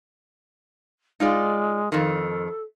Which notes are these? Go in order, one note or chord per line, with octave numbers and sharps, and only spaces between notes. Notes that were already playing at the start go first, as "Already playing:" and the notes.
G#3 D#4 F4 D5
F2 D#3 A4